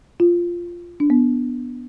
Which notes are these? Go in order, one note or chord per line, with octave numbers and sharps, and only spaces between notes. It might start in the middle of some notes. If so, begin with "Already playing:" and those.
F4
D4
B3